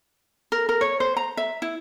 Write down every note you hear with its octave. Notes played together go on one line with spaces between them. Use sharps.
A#4
A#4
C#5
C5
A#5
E5
E4